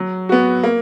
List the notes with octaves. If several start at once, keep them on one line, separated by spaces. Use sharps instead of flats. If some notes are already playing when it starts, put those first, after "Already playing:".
Already playing: F#3
B3 F#4
A#3